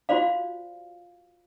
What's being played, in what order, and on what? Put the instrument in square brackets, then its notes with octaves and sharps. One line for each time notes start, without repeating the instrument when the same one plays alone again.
[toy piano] F4 F#4 C5 D5 F5